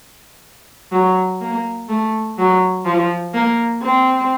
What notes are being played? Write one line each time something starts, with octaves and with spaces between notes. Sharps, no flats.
F#3
A#3
A3
F#3
F3
A#3
C4